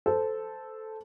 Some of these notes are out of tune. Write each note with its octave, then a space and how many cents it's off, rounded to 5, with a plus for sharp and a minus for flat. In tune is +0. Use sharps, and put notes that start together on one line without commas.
A4 -5 C5 -15